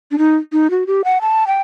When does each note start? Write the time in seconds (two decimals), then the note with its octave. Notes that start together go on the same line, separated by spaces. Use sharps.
0.11 D4
0.18 D#4
0.53 D#4
0.71 F#4
0.87 G4
1.04 F#5
1.21 A5
1.47 G5